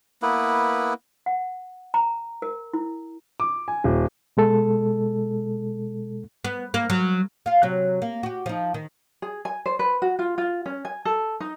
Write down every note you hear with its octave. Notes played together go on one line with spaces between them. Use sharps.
A#3 B3 E4 B4
F#5
A#5
A#4
E4
D6
G#5
D#1
B2 G#3 A4
B3
A#3
F#3
F4 F5
C3 F#3
A#3
F#4 G4
F3 D#4
D#3
G#4
G#5
C5
B4
F#4
F4
F4
C#4
G#5
A4
D#4